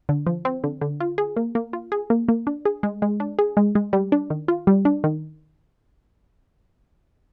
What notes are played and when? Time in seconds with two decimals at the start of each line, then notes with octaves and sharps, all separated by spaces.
0.09 D3
0.26 F3
0.45 C4
0.64 D3
0.81 D3
1.00 F4
1.18 G#4
1.36 A#3
1.55 A#3
1.73 F4
1.92 G#4
2.10 A#3
2.28 A#3
2.47 D4
2.65 G#4
2.83 G#3
3.02 G#3
3.20 D4
3.39 G#4
3.57 G#3
3.75 G#3
3.93 G3
4.12 D4
4.30 D#3
4.48 F4
4.67 G3
4.85 D4
5.04 D#3